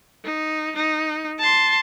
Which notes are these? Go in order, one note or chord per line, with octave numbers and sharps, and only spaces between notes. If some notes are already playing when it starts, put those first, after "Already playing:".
D#4
D#4
A5 C6